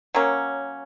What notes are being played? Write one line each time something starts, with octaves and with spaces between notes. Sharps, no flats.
F#3 A#3 C#4